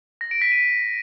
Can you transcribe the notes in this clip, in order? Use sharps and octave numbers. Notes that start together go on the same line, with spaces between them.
A#6
D7
B6
D#7